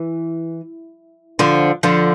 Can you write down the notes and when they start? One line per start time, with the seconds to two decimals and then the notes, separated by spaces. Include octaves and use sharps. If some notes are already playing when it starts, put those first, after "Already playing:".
Already playing: E3
1.39 D3 F3
1.83 D3 F3